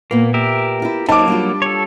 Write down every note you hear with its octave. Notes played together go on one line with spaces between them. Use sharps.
A#2 A#3 B3
G4 A#4 E5
E4 F4
F#3 A#3 D#4 F#4 C5 A5 D6
G3 D4 F4
A4 C#5